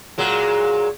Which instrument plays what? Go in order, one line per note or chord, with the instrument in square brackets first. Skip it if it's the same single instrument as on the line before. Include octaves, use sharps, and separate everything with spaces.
[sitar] A#2 F#3 G#3